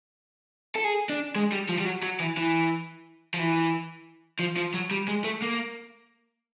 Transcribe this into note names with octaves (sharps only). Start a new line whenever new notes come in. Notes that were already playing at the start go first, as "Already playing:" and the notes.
A4
G#4
D4
G#3
G3
F3
G3
F#3
F#3
E3
E3
F3
E3
F3
F3
F#3
G3
G#3
A3
A#3